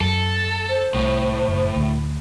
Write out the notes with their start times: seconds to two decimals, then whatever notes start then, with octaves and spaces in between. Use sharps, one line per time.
0.01 F#2 A4
0.69 C5
0.94 C2 A2
1.48 F#1
1.76 D2